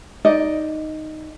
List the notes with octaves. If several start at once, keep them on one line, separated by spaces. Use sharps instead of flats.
D#4 D5 D#5